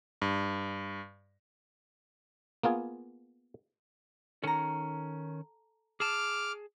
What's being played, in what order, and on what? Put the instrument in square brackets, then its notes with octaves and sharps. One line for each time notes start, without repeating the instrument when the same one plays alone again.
[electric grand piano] G2
[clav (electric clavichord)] A#3 B3 F4 G#4
[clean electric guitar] D#3 C#4 [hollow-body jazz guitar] A4 A#5
[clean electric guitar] G#4 A5 [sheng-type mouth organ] D6 F6